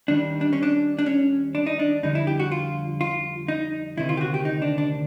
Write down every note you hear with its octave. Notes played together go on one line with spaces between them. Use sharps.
D#2 D#3 G3 D4
D4
C#4
D4
D4
C#4
D4
D#4
D4
F2 D3 G3 D#4
E4
G4
F#4
F4
F4
D#4
D2 C3 D#3 E4
F4
G4
F#4
G4
D#4
D4
D4